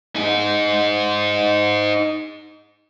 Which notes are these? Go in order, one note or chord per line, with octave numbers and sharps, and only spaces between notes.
D#4 G#4